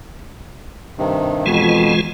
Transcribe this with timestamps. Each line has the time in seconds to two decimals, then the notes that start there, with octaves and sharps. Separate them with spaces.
0.98 G2 C3 D#3
1.46 F2 B2 E3 G#3 F4